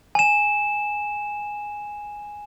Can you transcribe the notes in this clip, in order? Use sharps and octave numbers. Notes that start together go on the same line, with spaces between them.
G#5 E7